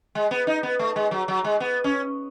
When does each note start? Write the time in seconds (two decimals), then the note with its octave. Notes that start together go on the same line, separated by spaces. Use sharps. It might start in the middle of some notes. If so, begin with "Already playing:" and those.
0.15 G#3
0.31 B3
0.47 D#4
0.63 B3
0.79 A3
0.96 G#3
1.11 F#3
1.28 F#3
1.44 G#3
1.60 B3
1.84 C#4